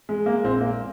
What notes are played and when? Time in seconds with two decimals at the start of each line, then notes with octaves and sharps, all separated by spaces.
0.09 G#3
0.26 A#3
0.44 A#1 C4
0.61 A#3